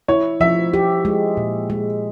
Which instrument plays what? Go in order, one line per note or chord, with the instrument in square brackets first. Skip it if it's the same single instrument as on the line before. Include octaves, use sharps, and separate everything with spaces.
[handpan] E4 [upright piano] C#5
[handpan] F3 [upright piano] E5
[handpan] G4
G#3
A#2
G#3